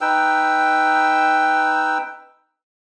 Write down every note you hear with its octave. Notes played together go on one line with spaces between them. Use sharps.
D#4 B4 G5 E6